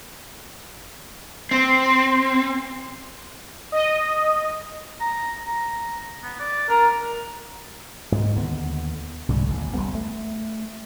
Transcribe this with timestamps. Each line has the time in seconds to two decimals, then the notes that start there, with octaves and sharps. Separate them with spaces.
1.51 C4
3.72 D#5
5.00 A#5
5.46 A#5
6.23 B3
6.40 D5
6.70 D4 A#4
8.12 G#2 G#3
8.36 D#2 D3 B3
9.28 C2 G#2 D3 G3
9.48 A1 D#2
9.74 F1 F2 G3 B3
9.95 A3